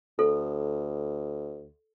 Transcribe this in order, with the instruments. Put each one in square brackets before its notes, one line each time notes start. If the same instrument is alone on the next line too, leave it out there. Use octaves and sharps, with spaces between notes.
[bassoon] D2 [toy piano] A4